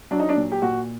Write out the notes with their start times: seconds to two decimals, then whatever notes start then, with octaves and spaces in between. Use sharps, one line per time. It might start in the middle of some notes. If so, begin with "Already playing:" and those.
0.11 F#3 D4
0.19 D#4
0.29 D4
0.37 A#2
0.52 G4
0.62 A#2 F#4